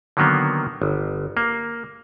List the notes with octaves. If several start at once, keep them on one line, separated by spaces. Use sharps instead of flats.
D3 D#3 F#3 A#3 B3
G1
A#3